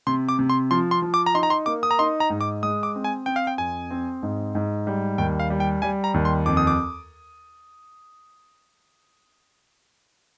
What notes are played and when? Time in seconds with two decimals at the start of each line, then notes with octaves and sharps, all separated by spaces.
0.07 C3 C6
0.29 D6
0.39 C3
0.50 C6
0.71 F3 C6
0.91 C6
1.02 F3
1.14 D6
1.26 A#5
1.34 D#4 C6
1.43 A#5
1.50 C6
1.66 A#3 D6
1.83 D#6
1.91 A#5
1.99 D#4 C6
2.20 A#5
2.30 G#2
2.41 D6
2.63 G#3 D#6
2.83 D6
2.95 C4
3.04 G#5
3.26 C4 G5
3.36 F5
3.47 G5
3.58 F2 G#5
3.90 C4
4.23 G#2
4.55 G#2
4.87 G3
5.18 D#2 G5
5.40 F5
5.50 G3
5.60 G5
5.82 G3 G#5
6.04 A#5
6.14 D#2
6.25 C6
6.46 F2 D6
6.57 D#6
6.67 D6